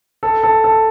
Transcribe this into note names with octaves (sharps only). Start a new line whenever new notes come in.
A4
A4
A4